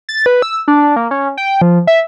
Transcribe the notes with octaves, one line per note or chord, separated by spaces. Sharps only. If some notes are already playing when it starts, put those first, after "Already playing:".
A6
B4
E6
D4
A#3
C#4
G5
F3
E5